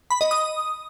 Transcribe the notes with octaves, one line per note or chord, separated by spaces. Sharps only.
B5
D#5
D#6